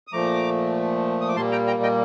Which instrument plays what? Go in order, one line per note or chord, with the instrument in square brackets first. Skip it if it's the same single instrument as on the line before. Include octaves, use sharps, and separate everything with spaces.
[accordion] D#6
A#2 F3 A3 A#5 D6
D#6
D6
A#2 G3 A#3 A5 C6
G5 A#5
G5 A#5
D#5 G5